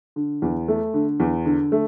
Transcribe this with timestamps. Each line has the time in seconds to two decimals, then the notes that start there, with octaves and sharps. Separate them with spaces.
0.16 D3
0.42 E2
0.68 A3
0.94 D3
1.20 E2
1.45 D3
1.72 A3